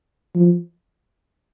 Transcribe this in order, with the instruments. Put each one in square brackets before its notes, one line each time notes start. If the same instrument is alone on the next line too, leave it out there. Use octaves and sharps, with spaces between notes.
[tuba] F3